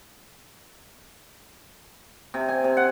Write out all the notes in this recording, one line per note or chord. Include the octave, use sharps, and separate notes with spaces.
C3
G#5
C3
F#5